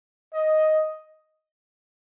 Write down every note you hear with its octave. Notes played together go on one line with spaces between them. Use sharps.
D#5